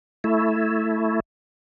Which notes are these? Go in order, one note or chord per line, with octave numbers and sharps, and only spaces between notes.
A3 E4